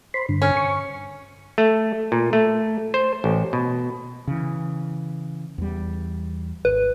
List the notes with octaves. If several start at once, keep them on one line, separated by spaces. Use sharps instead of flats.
C5 B5 C6
G2 D3
C#4
C#6
A3
A#2
A3
C5
A1
B2
C#3 E3
E2 G3
G#1 B4